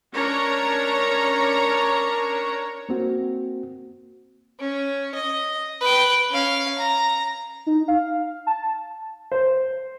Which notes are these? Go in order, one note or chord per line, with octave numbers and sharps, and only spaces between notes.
C#4 D4 A#4 C#5 A#5
A#3 C4 F#4
C#4
D#5
B4 G5
C#4 F5
A#5
D#4
F5
A5
C5